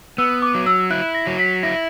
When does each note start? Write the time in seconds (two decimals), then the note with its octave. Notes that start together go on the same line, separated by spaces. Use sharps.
0.18 B3 E6
0.42 D6
0.55 F#3
0.67 E6
0.90 E4 F#6
1.15 A#6
1.27 F#3
1.39 B6
1.63 E4 A#6